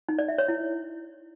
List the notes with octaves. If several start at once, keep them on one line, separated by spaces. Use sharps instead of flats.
D#4
D5
E5
C#5
E4